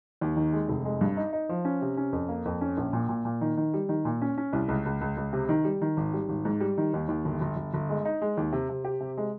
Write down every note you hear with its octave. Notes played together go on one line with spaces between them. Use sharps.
D#2
D#3
G#3
F1
G#3
G2
D#4
D#4
F3
C#4
C3
C#4
F2
A#3
F2
C#4
A#1
A#2
A#2
A#2
D#3
D#3
G3
D#3
A#2
C#4
C#4
C2
C#2
C#2
C#2
C#2
C3
D#3
G3
D#3
G#1
G3
G#1
G#2
G3
D#3
D#2
D#2
G1
G1
G1
G1
G#3
D#4
G#3
D#2
C3
C3
G4
C3
G#3